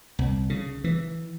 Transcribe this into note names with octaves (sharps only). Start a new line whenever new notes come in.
C2
C#3
E3